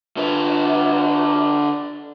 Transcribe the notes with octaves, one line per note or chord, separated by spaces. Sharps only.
D3 B4